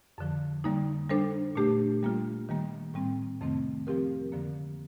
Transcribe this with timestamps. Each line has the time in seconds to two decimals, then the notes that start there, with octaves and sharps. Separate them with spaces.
0.18 F2 D3 F3
0.64 D3 G3 A#3 D#4
1.10 G3 D4 A4 C5
1.55 A#2 A3 D4 G4
2.03 G3 A#3 F4
2.49 D#3 G3 A#3
2.94 A2 G3 C4
3.41 F2 C3 D#3 A3 C4
3.87 F3 C4 G4 A#4
4.32 F2 D3 F3 A#3